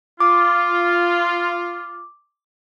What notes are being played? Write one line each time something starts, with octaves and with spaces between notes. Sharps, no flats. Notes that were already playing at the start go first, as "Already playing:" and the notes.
F4 D6